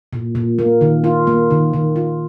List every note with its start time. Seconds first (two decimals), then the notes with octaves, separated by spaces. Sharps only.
0.13 A#2
0.35 A#2
0.59 A#3
0.81 D#3
1.04 F4
1.27 A#3
1.51 D#3
1.73 D#3
1.96 F4